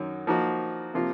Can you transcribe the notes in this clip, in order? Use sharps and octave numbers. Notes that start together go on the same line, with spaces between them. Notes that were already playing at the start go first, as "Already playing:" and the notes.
Already playing: F#2 D#3 F#3
F3 A#3 D#4 F#4
C3 F3 A#3 F4